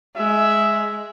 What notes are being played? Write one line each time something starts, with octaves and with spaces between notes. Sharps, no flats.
G#3 E5